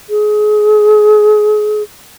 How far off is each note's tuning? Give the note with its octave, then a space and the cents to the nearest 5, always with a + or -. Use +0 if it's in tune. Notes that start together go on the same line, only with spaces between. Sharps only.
G#4 +30